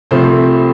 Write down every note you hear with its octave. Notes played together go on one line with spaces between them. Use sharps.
C2 C3 F3 A3 C5